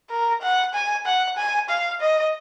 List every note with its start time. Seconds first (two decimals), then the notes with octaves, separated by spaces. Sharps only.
0.10 A#4
0.41 F#5
0.73 G#5
1.05 F#5
1.37 G#5
1.69 F5
2.00 D#5